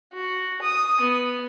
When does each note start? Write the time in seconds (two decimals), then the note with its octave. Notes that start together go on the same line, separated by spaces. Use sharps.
0.13 F#4
0.62 D#6
1.00 B3